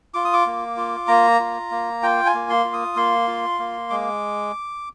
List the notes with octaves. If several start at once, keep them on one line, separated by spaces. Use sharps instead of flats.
F4 D6
D#6
D6
A#3
F4
A#3 A#5
F4
A#3
F4 G5
G#5
A#3
C6
F4
D#6
A#3 C6
F4
A#3
G#3 D6